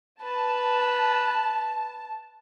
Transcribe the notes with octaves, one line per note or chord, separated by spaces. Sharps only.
B4 A5